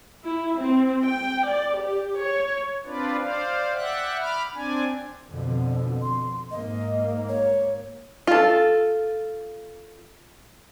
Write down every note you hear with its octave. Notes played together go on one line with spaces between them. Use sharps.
E4
C4
G5
D5
G4
C#5
C4 D4 F4 B4 D5
C5 D5 F5
D5 E5 F#5 G5 F#6
B5 D6 F6
C4 D4 D5 G#5
F2 B2 D3
C6
G#2 A#3 D#5
C#5
F4 A4